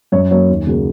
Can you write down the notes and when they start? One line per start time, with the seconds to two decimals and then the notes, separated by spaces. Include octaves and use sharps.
0.12 F#2 C#5
0.31 F#3 A#3 C#5
0.50 D#2
0.67 C#3 F#3 A#3